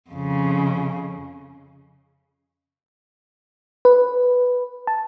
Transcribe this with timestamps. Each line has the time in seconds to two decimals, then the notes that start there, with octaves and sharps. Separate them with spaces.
0.10 F2 C#3
3.85 B4
4.87 A5